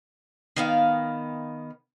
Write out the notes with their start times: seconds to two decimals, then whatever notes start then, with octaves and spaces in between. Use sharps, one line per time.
0.56 D#3 B3 F5